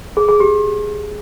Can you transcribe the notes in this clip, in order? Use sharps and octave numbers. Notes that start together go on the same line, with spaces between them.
G#4
G#4
G4